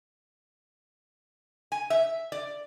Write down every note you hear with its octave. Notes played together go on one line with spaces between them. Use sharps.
G#5
E5
D5